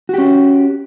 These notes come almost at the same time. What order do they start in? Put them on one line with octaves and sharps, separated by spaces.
F#4 G4 C#4